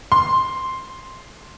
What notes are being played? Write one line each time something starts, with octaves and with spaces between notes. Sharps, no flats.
C6